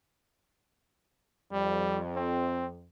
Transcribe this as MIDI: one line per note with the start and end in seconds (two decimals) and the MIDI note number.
1.52 2.85 41
1.52 2.00 55
2.16 2.66 60